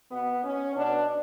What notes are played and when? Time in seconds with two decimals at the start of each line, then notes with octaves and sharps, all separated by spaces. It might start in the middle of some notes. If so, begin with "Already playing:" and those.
0.11 B2 B3
0.44 C#4
0.76 B2 D4